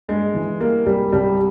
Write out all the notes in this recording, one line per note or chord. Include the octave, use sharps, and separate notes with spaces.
G2 G#3
E3
G3 A#3
C2 G3
C2 G3